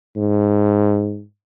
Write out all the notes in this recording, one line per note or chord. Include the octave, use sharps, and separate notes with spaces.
G#2